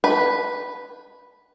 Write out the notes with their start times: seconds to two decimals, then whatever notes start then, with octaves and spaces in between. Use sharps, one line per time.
0.04 B4